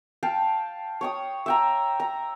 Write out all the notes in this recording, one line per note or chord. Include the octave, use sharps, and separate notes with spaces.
F5 G5 A5
C#5 G5 D#6
E5 G5 A#5
A#5